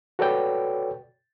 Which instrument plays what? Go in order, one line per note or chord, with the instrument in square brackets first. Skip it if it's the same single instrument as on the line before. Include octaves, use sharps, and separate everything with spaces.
[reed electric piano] F#4 A4 B4 C#5 D5 G5